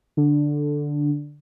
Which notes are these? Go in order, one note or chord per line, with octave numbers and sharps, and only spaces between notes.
D3